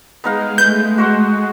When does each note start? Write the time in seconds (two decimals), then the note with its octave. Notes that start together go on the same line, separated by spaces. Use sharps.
0.24 G#3 B3 D#4 F5
0.58 A3 B4 G6
0.98 F#4 C5 F#5